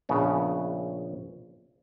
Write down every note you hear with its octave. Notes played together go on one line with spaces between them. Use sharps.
A#1 C#3 B3